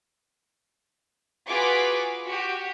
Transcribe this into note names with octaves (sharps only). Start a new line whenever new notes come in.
F4 F#4 G#4 B4 G#5 D6
F#4 G4